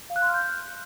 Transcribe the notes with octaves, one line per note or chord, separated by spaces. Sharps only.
F5
F#6
C6
F6
G6